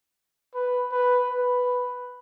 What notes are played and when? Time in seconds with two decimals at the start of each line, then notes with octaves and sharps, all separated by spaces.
0.55 B4
0.92 B4
1.30 B4